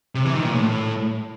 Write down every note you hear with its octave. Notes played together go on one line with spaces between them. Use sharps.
C3
E3
D#3
A#2
A2